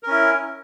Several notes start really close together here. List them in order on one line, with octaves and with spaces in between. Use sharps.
A#4 C#4 E4